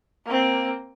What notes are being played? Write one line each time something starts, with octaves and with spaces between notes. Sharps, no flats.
A#3 C4